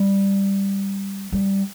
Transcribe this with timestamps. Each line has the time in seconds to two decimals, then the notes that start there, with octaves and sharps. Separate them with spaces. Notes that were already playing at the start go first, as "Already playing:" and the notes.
Already playing: G3
1.32 G3